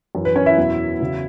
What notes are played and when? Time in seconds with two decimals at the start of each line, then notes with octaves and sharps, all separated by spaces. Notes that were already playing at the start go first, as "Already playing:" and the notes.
0.15 F#2 E3
0.25 B4
0.35 C#4 C#5
0.46 E4 E5
0.57 E2 B2 F#3
1.01 E2 C#3 F#3